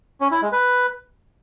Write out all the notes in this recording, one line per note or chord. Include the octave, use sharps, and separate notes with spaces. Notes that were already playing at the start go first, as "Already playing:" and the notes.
C#4
E4
G#3
B4